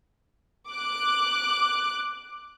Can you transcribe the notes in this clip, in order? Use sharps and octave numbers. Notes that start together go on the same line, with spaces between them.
D6 F#6